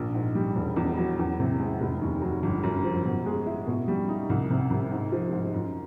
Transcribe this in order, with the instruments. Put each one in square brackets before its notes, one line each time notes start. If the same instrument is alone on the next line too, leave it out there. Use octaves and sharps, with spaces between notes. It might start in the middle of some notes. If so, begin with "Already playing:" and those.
Already playing: [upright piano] A#1 A#3
G#2
G3
E1
E2
F#3
E2
C3
G#3
F1
D#2
F#3
G1
F#2
F3
B2
G#3
E4
B2
G3
D#4
C2
C3
C2
G#2
F3
G#2
F#2